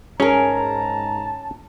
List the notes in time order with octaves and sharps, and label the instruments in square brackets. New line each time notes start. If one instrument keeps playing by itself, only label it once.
[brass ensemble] G#2 A#5 [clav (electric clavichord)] C#4 [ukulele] G#4 A#4 [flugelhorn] A5